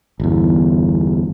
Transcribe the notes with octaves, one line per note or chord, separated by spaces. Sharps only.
G1 E2